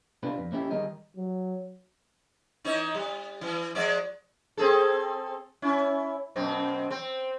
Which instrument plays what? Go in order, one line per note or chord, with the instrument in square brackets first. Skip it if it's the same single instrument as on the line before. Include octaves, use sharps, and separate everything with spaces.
[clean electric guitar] C3 D4 F4 B4
F2
A#3 C#4 E4 G4
D#3 G3 G#4 A#4 D#5
[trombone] F#3
[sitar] E3 D#4 C#5
G3
E3
F3 G#3 D5
C4 G#4 A4
C#4 E4
F#2 B2 C4
C4